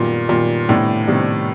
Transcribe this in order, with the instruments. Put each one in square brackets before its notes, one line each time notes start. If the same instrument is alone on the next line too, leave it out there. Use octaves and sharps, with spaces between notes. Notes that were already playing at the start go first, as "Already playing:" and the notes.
Already playing: [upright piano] F#2 D#3 G3 B3 [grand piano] A#2
[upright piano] F#2 D#3 G3 B3 [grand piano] A#2
[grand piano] A2 [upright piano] C3 D#3 G3 B3 D4
[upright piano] C3 D#3 G3 B3 D4